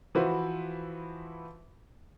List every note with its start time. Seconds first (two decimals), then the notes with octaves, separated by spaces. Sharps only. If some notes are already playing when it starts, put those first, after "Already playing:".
0.15 E3 F3 E4 F#4 B4 C5